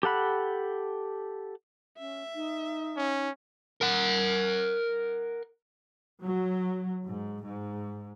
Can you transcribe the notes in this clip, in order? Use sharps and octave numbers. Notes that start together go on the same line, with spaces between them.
G4 A4 F#5 B5
C#4 E5
D#4
C#4
A#4 F#5
F#3
G#2
G#2